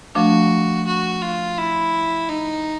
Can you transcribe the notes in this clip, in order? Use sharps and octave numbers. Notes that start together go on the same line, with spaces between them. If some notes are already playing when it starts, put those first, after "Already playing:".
F3 A3 D4 F#4
F#4
F4
E4
D#4